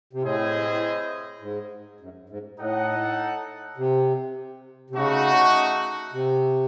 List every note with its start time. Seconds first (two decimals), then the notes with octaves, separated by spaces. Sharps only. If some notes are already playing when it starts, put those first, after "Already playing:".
0.13 C3
0.23 A2 C4 E4 G#4 C5 D#5
1.41 G#2
2.01 F#2
2.30 G#2
2.59 A2 D#4 A4 D#5 F#5
3.77 C3
4.90 C3
4.95 C#3 A3 D#4 F#4
6.13 C3